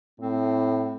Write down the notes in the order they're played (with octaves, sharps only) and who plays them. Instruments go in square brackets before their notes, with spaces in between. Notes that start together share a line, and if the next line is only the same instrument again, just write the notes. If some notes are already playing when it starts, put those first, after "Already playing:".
[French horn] A2 [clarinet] C4